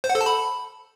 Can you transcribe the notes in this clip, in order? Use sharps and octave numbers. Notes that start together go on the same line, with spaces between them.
C5
F#5
A4
A5
B5